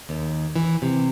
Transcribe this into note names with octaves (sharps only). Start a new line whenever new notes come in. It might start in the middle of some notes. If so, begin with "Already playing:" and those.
D#2
E3
C3